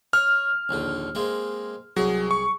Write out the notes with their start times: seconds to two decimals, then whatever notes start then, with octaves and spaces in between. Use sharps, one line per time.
0.13 C#5 F6
0.69 A#1 D#2 D3
1.15 G#3 A#3 C4
1.97 C2 F#3 G#4
2.31 C#6